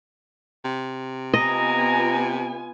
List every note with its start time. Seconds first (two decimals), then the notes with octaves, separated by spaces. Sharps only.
0.65 C3
1.34 B3 F4 D#5 G#5 A#5